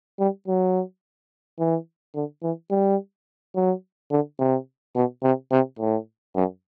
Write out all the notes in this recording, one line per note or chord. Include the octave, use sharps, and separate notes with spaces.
G3
F#3
E3
D3
E3
G3
F#3
D3
C3
B2
C3
C3
A2
F#2